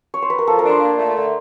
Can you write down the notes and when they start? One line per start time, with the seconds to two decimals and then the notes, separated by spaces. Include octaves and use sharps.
0.14 C#5
0.22 C5
0.30 B4
0.39 A#4
0.47 F3 A4
0.59 A#4
0.65 D4 C5
0.82 A#2
0.99 A3
1.16 D3